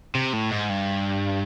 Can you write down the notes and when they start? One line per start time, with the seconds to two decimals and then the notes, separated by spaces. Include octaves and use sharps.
0.15 C3
0.33 A2
0.51 G#2
0.70 G2